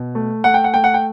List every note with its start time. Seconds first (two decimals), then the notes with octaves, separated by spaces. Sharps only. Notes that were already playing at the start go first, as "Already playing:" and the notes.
Already playing: B2
0.15 A3
0.44 A3 F#5
0.54 G5
0.64 F#5
0.74 A3 G5
0.84 F#5
0.94 G5